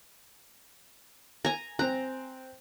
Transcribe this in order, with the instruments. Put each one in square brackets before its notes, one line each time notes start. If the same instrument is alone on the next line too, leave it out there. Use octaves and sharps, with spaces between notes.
[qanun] G#5 A#5
[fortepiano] C4 F#6 [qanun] A#5